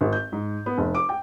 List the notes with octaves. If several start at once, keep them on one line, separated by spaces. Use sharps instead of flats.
G#1
G6
G#2
B3
F1
D6
G5